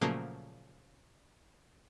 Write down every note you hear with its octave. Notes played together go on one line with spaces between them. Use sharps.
A#2 C#3 F3 F#3 A3 A#3